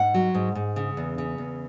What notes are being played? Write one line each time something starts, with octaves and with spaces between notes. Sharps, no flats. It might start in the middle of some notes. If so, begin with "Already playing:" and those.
Already playing: G#2 F#5
F#3
G#2
G#2
C#3
E2
C#3
E2